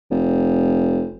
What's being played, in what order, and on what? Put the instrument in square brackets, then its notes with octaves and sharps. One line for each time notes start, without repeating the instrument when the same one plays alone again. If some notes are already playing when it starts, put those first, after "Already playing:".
[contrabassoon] F1